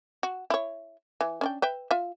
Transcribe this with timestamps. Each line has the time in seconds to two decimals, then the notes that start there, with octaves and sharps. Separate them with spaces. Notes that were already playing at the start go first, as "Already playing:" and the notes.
0.23 F#4
0.50 E4 C#5
1.21 E3
1.41 C#4 D4 G5
1.62 B4 E5 G5
1.91 F4 E5